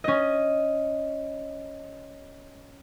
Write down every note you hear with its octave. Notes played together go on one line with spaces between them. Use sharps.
C#4 D#5